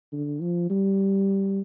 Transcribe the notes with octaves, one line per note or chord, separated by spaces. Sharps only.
D3
F3
G3